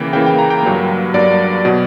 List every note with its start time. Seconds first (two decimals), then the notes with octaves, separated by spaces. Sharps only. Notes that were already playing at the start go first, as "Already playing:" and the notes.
Already playing: C#3 E3 A#3 G5
0.13 C#3 E3 A#3 G5
0.26 G5
0.39 A#5
0.50 G5
0.63 G2 F#3 A#3
1.14 G2 F#3 A#3 D5
1.65 B2 F#3